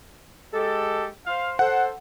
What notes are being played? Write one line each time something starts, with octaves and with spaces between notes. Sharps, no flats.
G#3 G4 A4
C5 F5
A4 C5 F#5